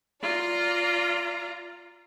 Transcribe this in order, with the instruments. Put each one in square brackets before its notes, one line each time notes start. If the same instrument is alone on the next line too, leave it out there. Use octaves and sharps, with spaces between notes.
[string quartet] F4 D5 A#5